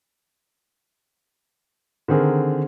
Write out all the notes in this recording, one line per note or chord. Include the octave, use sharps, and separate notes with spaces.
D3 D#3 C4 G#4 A#4